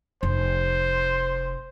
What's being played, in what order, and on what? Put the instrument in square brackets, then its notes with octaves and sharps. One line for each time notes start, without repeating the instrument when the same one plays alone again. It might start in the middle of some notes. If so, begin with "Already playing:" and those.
[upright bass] F1 [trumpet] C5